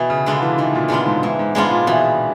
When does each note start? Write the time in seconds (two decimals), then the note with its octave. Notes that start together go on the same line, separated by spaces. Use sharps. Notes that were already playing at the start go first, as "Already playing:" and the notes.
Already playing: B2 E3
0.10 C#3
0.26 D3 G#3 B3 D4 F4
0.42 E3
0.58 D#3 E3
0.75 A#2
0.88 A#2 G#3 B3 D4 F4
1.06 G#2
1.23 G#2 E3
1.39 G#2
1.55 G#2 G#3 B3 D4 F4
1.71 A#2
1.87 B2 E3